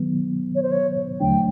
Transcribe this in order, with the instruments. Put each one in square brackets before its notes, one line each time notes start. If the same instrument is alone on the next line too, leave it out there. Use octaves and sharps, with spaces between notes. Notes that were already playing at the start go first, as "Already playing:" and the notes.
Already playing: [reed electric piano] D#3 F#3 B3
[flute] C#5
C5
C#5
[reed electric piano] D#2 D3 F#3 A3 D4 [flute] G5